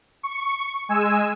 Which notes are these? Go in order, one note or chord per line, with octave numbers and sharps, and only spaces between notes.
C#6
G#3 G#5 E6